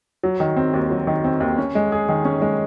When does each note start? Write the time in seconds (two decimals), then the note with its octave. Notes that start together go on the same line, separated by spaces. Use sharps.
0.23 F#3
0.40 D#3
0.57 C4
0.73 D#2
0.90 F#3
1.07 D#3
1.24 C4
1.40 D#2
1.58 C#4
1.75 G#3
1.92 G#4
2.09 D#3
2.25 C#4
2.42 G#3